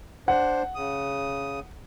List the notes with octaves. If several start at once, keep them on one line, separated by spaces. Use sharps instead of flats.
D4 C5 F#5
C#3 D#6